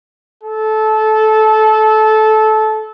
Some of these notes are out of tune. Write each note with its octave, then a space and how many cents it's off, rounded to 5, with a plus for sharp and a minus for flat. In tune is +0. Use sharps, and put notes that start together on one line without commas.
A4 -20